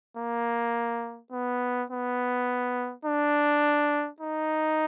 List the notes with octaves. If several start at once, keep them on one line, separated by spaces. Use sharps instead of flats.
A#3
B3
B3
D4
D#4